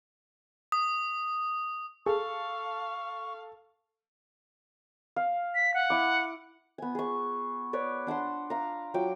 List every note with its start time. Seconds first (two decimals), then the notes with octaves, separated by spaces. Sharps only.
0.72 D#6
2.06 G#4 A4 F5 C#6
5.16 F5
5.55 B6
5.74 F#5
5.90 E4 D6
6.78 B3 G#5
6.95 G#4 C#6
7.73 B4 C#5 D5
8.07 D4 F#5 A5 C6
8.50 F5 A#5
8.94 F#3 F4 G5 D6